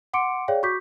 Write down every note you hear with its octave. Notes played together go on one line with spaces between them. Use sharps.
F#5 C6 D6 C#7 D7
G#4 C#5 D5 F5 G5
F#4 C#6 D6 G6 B6